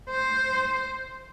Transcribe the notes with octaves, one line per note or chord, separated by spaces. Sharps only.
C5